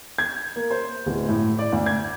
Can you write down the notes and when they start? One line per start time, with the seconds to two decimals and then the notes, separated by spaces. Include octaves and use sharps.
0.18 G#6
0.56 A#3
0.71 C5
1.06 D1
1.29 A2
1.59 D5
1.72 D2
1.86 G#6